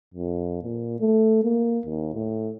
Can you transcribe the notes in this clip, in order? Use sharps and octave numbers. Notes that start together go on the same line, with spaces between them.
F2
A#2
A3
A#3
D#2
A2